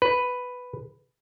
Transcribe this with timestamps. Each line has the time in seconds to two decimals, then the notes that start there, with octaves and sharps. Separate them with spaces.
0.02 B4